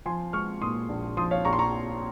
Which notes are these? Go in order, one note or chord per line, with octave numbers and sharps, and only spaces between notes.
F3 G#5 C6
G#3 C#6 F6
A#2 C6 D#6
A#1
F3 C6 D#6
C#5 F5
A#1 A#5 C#6
C6
A#5 C#6